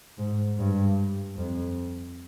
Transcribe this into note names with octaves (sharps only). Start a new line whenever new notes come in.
G#2
G2
F2